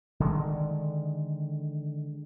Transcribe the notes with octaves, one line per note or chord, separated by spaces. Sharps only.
D3 D#3 G#3